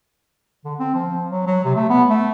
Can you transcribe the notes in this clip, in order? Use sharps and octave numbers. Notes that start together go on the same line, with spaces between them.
D3
C4
F3
F#3
F#3
C3
A3
B3
A3